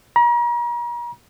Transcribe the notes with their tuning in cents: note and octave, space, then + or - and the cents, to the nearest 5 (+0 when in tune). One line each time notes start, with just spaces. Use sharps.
A#5 +40